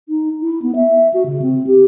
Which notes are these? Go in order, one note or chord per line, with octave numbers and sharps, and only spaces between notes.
D#4
E4
B3
E5
F#4
C#3
C4
G4